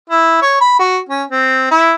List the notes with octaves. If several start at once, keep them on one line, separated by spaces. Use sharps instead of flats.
E4
C#5
B5
F#4
C#4
C4
E4